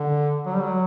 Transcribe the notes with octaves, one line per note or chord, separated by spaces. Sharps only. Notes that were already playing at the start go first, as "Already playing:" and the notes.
Already playing: D3
F#3
G3
F#3